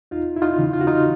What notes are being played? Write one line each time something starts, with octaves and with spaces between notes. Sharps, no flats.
E2 D#4 F4
E4
D#4 F4
C#3 E3
F4
F#4
D#4 F4